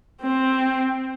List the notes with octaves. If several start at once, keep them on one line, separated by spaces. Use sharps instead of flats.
C4